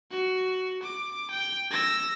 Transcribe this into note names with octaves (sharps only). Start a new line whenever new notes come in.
F#4
D6
G5
E6 A#6